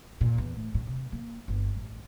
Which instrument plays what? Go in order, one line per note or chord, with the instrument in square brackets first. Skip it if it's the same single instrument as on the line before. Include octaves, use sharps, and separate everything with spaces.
[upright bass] A#2
E2
A2
A2
C3
A#3
G1
A1